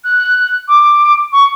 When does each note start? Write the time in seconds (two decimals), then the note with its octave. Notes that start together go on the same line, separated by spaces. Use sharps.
0.04 F#6
0.68 D6
1.32 C#6